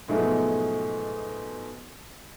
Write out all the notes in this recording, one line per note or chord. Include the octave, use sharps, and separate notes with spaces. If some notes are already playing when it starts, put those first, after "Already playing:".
G#2 B2 F3 F#3 G#3 A3